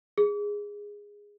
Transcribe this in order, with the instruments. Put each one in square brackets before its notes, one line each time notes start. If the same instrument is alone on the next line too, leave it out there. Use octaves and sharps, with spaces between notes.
[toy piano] G#4